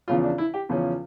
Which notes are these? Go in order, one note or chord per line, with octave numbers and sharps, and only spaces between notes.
E2 C#3 F3 C#4 F4
D4
E4
G4
E2 C#3 F3 C#4